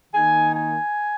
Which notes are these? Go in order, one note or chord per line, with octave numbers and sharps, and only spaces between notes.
D#3 A#3 D#4 G#5
G#5